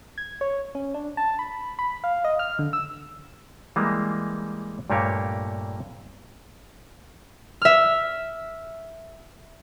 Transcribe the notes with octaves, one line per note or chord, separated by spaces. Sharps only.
G#6
C#5
C#4
D4
A5
B5
B5
F5
D#5
F6
D3
E6
E3 G3 G#3 A#3
G2 A#2 A3 A#3 G4 C#5
E5 F6